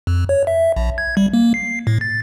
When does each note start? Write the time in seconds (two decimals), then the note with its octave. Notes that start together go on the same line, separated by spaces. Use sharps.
0.07 F2
0.29 C#5
0.47 E5
0.76 A#1
0.98 G#6
1.17 G3
1.33 A#3
1.54 C7
1.87 A2
2.01 A6